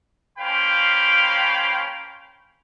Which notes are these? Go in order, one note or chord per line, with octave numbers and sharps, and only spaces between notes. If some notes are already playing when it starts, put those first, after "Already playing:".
A#3 C#4 C5 F5 G5 B5